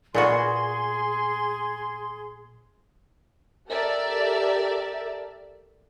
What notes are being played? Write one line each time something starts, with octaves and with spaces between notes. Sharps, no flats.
A#2 B3 F#4 G#4 C6
G4 A4 A#4 D5 E5